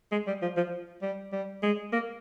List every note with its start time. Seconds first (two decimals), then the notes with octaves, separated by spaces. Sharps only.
0.12 G#3
0.27 G3
0.42 F3
0.57 F3
1.02 G3
1.32 G3
1.62 G#3
1.93 A#3